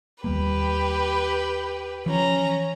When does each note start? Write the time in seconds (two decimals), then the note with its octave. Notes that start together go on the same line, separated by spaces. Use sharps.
0.24 D#2 G3 A#3 G4 B4
2.06 E3 F3 C#4 A#5